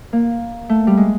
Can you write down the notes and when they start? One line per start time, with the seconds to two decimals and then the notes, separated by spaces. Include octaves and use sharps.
0.13 A#3
0.69 A3
0.87 G3
0.97 G#3